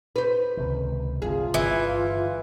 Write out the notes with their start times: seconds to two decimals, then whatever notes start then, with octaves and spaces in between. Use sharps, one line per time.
0.16 B4 C5
0.57 C#2 C3 D#3
1.22 G1 C2 D#3 F4 G#4
1.54 G1 E3